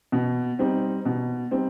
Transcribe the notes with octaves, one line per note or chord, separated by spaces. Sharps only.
B2
G3 C4 D#4
B2
G3 C4 D#4